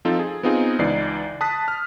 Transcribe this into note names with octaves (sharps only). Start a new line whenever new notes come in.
F3 C4 D#4 F4 A4
G#4
B3 C4 D#4 F4 G#4
C#2 E3 D#4 D5 C7
A5 D#6 F#6 B6
F6